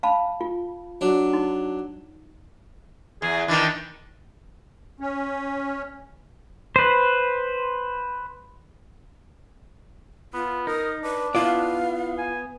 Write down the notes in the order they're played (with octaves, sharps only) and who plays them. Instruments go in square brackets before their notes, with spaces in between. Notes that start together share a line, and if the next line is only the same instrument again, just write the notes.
[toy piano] F5 A5 B5
F4
[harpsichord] F#3 D4
[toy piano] D#4
[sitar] E2 [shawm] G#4
[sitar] D#3 E3 [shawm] D4
[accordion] C#4
[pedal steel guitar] B4 C5
[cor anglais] B3 [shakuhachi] F4
[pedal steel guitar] D#4 [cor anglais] A#4 [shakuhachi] D#6
[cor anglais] D4 [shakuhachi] B4
[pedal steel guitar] B3 [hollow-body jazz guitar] E4 F4 D5 [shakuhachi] F5
[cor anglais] G#5